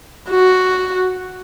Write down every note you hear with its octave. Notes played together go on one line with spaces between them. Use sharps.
F#4